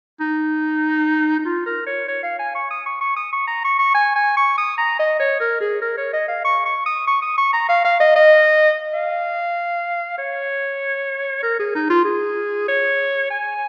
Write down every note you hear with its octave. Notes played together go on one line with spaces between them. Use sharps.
D#4
D#4
F4
A#4
C#5
C#5
F5
G#5
C#6
D#6
C#6
C#6
D#6
C#6
A#5
C#6
C#6
G#5
G#5
C#6
D#6
A#5
D#5
C#5
A#4
G#4
A#4
C#5
D#5
F5
C#6
C#6
D#6
C#6
D#6
C#6
A#5
F5
F5
D#5
D#5
F5
C#5
A#4
G#4
D#4
F4
G#4
C#5
G#5